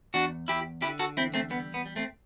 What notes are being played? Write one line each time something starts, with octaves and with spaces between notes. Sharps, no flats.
E2 D4 F#4
E2 E4 G4
D3 E4 G4
F#4 A4
E2 C4 E4
A3 C4
G3 B3
B3
G3
A3 C4